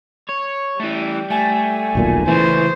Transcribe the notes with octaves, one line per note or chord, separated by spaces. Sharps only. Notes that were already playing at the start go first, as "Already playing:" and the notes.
C#5
E3 G3 A3
A3 G#5
D#1 B1 A#2
C#3 E3 A3 C5